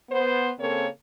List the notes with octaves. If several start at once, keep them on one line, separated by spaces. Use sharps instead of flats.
B3 C5
C#3 A#3 C4 A4 A#4 C#5